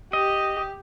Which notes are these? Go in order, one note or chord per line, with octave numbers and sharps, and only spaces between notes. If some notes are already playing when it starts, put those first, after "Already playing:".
G4 D#5